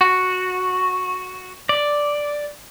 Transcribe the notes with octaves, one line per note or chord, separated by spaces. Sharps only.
F#4
D5